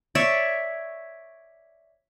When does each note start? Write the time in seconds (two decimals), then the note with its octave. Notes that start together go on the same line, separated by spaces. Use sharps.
0.15 C#5 D5 E5